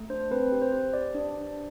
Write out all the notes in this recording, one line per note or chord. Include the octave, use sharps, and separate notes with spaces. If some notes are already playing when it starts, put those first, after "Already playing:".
Already playing: A3
D4 C5
C4 B4
G4
C5
G4
G4 D5
D4
D4